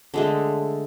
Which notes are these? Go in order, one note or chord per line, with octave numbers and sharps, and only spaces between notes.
D3 G#3 A3